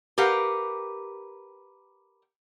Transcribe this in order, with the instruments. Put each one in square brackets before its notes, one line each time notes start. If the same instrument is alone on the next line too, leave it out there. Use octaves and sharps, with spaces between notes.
[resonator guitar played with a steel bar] G4 A#4 B4 F5 F#5